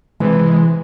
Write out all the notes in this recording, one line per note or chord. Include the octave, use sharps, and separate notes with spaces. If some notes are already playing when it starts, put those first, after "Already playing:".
C3 E3 G#3